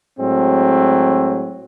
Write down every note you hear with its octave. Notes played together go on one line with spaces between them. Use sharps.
A2 F#3 G#3 C4